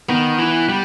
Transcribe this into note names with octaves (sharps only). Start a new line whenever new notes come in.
D#3 B3
E3
G3